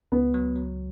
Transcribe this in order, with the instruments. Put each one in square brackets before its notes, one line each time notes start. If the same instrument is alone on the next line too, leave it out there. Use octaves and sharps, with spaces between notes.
[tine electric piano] C#2 [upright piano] B3
[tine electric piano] F#3
F#3